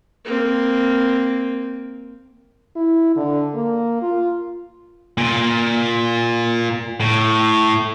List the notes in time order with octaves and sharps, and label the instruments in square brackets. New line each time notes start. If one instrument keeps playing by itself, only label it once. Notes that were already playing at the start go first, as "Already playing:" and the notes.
[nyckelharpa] A#3 C4
[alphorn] E4
D3
A#3
F4
[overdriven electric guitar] A#2
A2